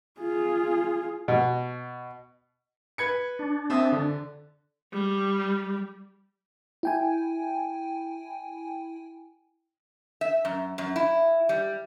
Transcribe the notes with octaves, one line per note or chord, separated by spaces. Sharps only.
F4 G#4
B2
B4 G#6 C#7
D4
C4 E5 D#6
D3
G3
E4 G5 G#5
E5
F#2
F#2
E4
G3